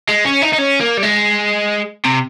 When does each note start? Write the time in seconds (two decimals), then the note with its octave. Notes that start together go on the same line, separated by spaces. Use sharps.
0.09 G#3
0.25 C#4
0.43 D#4
0.54 D#4
0.59 C#4
0.80 A#3
0.98 G3
1.03 G#3
2.06 C3